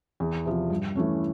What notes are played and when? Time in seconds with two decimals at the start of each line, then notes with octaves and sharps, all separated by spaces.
0.20 E2
0.45 C3 F3
0.70 G2
0.96 E3 A3 C#4